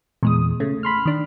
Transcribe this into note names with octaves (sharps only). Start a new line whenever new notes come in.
E2 A#2 G#3 D#6
C#3 A3
B5 C6 F6
D#3 D4